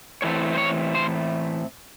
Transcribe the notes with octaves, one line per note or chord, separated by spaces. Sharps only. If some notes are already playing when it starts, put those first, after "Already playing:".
A2 E3 A3 C4 C#5
C5
C#5
C5